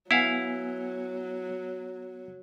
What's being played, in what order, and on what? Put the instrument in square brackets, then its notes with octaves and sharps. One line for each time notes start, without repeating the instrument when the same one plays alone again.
[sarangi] F#3 [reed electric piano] B3 F#5 G#5 [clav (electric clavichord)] E4 F5